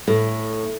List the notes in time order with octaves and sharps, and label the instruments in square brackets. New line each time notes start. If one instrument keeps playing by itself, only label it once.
[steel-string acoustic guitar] A2